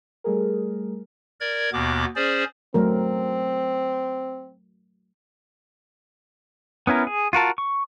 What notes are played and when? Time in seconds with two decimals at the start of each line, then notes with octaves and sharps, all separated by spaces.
0.24 G3 A3 G#4 A#4
1.41 A#4 D5 G#6
1.73 D#2 B2 B3 D6
2.16 C#4 G#4 C5 D5
2.74 F#3 A3 C4 A#4
6.87 B3 C#4 E4 A#4
7.07 G#4
7.33 F4 F#4 A#4 A5
7.58 C#6